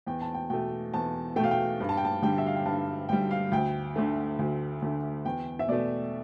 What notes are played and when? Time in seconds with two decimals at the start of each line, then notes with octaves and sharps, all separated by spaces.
0.07 E2 G5
0.21 A5
0.34 G5
0.50 B2 A3 G5
0.94 E2 A5
1.36 A3 G5
1.40 B2 F5
1.51 G5
1.80 G2
1.89 A5
1.97 G5
2.05 A5
2.22 D3 G3 G5
2.38 E5
2.46 F5
2.56 G5
2.66 G2 A5
3.09 D3 G3 G5
3.31 F5
3.52 D2 G5
3.96 D3 A3
4.39 D2
4.82 D3 A3
5.25 E2 G5
5.59 E5
5.68 B2 A3 D5